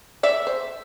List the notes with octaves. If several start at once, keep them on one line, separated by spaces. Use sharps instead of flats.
D5 E5
C5